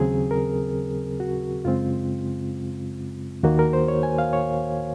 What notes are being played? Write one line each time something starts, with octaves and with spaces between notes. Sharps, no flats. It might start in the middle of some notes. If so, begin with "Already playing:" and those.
Already playing: D#2 C#3 F#3 C4 G#4
A#4
F#4
F#2 C#3 G#3 C4 F4
D#2 D#3 A#3 F#4
A#4
C5
C#5
G#5
F5
C#5